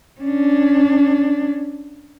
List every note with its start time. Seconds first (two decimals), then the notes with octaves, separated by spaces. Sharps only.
0.21 C#4 D4